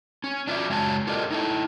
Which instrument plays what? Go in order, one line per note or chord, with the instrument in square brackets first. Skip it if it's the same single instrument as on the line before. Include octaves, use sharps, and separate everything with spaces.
[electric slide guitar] C#4
D4 F4 F#4 D5 E5
F#2 C#3 F#3 G#3 G#5 A5
F4 G4 A4 A#4 D5 D#5
D#4 E4 A4